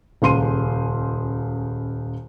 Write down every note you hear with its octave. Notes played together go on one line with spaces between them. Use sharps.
D#1 C#2 C6 D#7